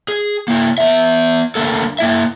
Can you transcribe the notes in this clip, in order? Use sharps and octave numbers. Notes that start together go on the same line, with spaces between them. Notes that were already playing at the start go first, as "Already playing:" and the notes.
G#4
A#3 E4
B3 E5
D3 G3 A3 A#3 A4
A#3 E4 E5